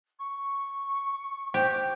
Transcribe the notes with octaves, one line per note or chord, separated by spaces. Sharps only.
C#6
G4 C5 G5